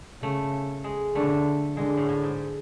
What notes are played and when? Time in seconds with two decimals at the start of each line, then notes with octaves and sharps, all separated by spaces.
0.22 C#3 A3
0.84 G#3
1.15 D3 A3
1.77 D3 G#3
1.97 A2
2.09 A2
2.23 G#2